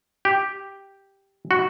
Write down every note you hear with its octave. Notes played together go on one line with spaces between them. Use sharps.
G4
F#4